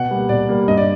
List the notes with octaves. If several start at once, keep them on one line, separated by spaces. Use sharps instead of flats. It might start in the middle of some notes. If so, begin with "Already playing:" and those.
Already playing: B2 F#5
G3 A#3
B2 D5
G3 A#3
G2 D#5
D5